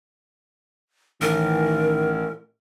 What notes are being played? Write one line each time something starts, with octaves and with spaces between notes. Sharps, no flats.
A1 D#3 A#4